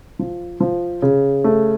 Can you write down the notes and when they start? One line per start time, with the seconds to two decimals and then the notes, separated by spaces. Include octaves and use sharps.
0.19 F3
0.60 F3
1.02 C#3
1.44 A3